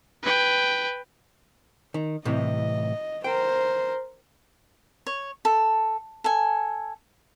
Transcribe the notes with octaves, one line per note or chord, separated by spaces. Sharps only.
B4 G5
D#3
A2 C3 E3 D#5
A#4 C5 G5
C#5
A4
A4 G#5